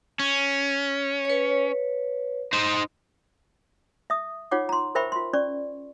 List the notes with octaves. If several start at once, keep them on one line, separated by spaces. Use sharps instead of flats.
C#4
B4 C#5
D#4 C5
E5 D#6
D#4 F4 C#5 F#5 D6
A#5 C6
A#4 C5 E5 G5 B5 C#6
F4 C6
C#4 D5 C#6